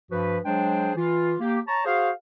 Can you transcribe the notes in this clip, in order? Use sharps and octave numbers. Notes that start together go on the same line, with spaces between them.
G2 F3 F#4 B4
F#3 G#3 D4 G#4 C5 G5
E3 F4
A#3 G4
C#5 A5 A#5
F#4 G#4 C5 F5